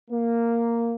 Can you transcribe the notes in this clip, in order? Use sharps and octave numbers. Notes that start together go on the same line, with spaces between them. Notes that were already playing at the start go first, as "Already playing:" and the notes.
A#3